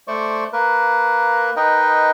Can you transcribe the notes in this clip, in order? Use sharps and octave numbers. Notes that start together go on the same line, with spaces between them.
A3 C5 D5 C#6
A#3 A#4 B4
D#4 A#4 B4 D#5 G5